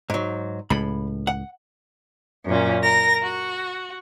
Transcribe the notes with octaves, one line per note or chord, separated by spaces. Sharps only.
G#2 F#3
C#2 A2 B5
F#5
F#2 A#2 C#4
A#4 A#6
F#4